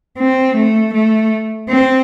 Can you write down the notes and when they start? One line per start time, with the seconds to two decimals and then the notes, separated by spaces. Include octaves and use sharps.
0.18 C4
0.56 A3
0.94 A3
1.69 C4